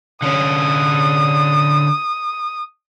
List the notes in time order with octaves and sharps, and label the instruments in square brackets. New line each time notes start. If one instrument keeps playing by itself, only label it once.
[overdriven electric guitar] D3 C#4 [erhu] D#6